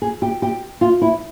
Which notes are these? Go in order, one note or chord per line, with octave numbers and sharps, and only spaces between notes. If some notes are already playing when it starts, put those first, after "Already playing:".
G#4
G4
G4
F4
E4